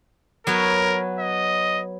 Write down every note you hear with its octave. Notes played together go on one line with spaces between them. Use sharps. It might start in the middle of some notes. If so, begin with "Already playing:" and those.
F#3 B3 A#4 C#5
D#5